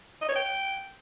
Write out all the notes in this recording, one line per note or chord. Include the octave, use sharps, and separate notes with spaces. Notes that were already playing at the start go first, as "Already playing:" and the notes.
D#5
C#5
G5